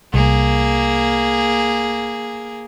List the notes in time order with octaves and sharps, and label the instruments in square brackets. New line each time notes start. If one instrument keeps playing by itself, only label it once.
[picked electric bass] C2 [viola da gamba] A#3 G#4